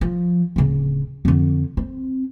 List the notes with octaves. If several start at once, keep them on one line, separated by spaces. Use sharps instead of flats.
F3
D1 C#3
F2 D3
C4